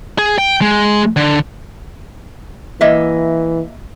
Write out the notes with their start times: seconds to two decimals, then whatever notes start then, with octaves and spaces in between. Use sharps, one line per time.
0.18 G#4
0.38 G5
0.61 G#3
1.16 D3
2.81 E3 A#3 D#5 E5